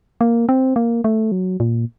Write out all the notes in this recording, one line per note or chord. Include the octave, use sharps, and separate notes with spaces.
A#3
C4
A#3
A3
F#3
A#2